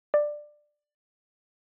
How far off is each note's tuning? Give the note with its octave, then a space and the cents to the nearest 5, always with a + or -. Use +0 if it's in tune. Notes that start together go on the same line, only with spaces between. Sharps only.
D5 +15